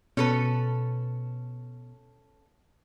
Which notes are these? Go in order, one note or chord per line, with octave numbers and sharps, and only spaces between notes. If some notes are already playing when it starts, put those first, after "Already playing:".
B2 C#4 A4 B4